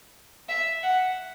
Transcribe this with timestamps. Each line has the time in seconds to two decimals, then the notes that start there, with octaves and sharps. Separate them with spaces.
0.49 E5
0.83 F#5